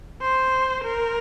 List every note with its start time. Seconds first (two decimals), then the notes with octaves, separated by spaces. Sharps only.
0.21 C5
0.84 A#4